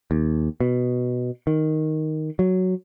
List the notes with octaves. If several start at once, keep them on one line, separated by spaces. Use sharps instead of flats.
D#2
B2
D#3
F#3